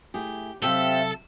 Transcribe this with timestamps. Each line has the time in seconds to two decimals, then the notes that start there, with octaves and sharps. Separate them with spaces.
0.14 A3 E4 G4 G#4
0.63 C3 F#3 C4 G4 A4 E5 F5